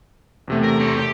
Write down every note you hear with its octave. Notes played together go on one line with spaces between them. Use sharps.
E2 C3 A3
A#4
C4 C#5
G4